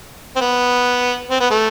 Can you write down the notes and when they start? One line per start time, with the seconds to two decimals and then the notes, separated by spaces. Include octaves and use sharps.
0.36 C4
0.41 B3
1.30 C4
1.40 B3
1.50 A3